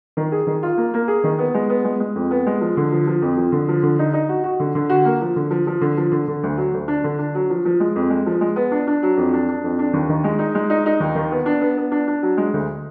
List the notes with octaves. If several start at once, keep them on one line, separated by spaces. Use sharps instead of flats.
D#3
G#4
D#3
F4
A#3
A#3
G#4
D#3
B3
G#3
B3
G#3
G#3
F2
B3
G#3
F3
D3
F3
F3
F2
F3
D3
F3
D3
D#4
D#4
F#4
F#4
D3
D3
F#4
A#3
F3
D3
F3
F3
D3
F3
D3
D3
D2
F#3
D2
D4
D3
D4
F#3
F3
F3
G#3
F2
G#3
F3
G#3
B3
D4
D4
F#3
F2
D4
D4
F2
D4
D#2
D#3
G#3
D#4
G#3
D#4
D#4
D#2
D#3
B3
D4
B3
B3
D4
D4
F#3
G#3
D2